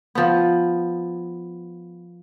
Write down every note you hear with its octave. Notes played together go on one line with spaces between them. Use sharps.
F3 B3